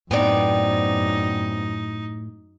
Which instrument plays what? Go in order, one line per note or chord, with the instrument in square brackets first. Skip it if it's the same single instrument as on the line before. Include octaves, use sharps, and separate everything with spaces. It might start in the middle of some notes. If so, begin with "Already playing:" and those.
[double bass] F#2 [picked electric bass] A2 [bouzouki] B3 C4 D5 [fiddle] D#4